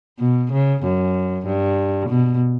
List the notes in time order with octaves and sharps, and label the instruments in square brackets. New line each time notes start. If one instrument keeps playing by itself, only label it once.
[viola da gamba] B2
C#3
F#2
G2
B2